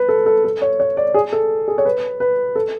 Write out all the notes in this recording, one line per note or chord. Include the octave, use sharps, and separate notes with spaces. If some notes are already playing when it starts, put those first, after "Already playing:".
Already playing: B4
A4
A4
A4
C#5
C#5
D5
G#4
A4
G#4
C#5
B4
B4
A4